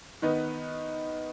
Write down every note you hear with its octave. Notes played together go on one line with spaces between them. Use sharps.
D#3 B3 D#4 B4